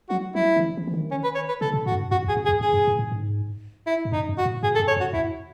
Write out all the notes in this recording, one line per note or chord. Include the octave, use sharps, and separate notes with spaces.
F#3 F#4
F#3 E4
D#3
E3
E3
E3
D#3
C#4
B4
C#5
B4
C#3 A4
B2
A2 F#4
F#2
G#2
F#2 F#4
E2
G#4
F#2
G#4
E2
F#2 G#4
F#2
A2
A2
G#2
E4
G#2
F#2 D#4
F#2
F#4
A2
G#2 G#4
A4
F#2
C#5
F#2
F#4
E2 E4